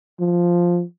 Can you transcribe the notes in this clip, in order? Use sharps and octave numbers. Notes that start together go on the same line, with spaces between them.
F3